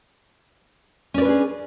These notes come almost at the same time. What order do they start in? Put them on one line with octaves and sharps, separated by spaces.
C#4 D5 B4 D4 G#4